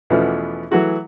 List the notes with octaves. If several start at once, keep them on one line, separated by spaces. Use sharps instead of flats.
E2 B2 E3 F3 A3 C#4
E3 F#3 A3 F#4 G#4